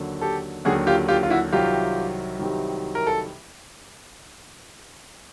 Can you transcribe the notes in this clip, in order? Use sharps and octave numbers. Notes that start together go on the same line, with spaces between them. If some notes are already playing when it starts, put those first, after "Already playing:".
Already playing: D#2 D3 F#3
G4 A4
D#2 D3 F#3 F#4 G#4
F4 G4
F4 G4
F4
E4 F#4
C2 C3 D#3 F#3 F4 G4
C2 C3 D#3 F#3
A#4
A4